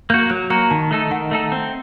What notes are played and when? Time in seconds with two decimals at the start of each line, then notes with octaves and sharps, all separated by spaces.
0.10 A#3 F#4 G6
0.30 F#3 F#6
0.50 A#3 F#4 A#5
0.70 D#3 A5
0.91 A3 D#4 A4
1.11 D#3 F#5
1.31 A3 D#4 A4
1.52 C4